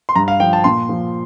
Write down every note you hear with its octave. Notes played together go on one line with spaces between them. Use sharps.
C6
G2 A#5
F5
F3 G5
A5
A#2 C6
F3